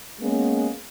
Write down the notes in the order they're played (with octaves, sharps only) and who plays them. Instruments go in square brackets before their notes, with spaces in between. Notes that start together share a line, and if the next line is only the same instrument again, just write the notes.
[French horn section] G#3 A#3 B3 C#4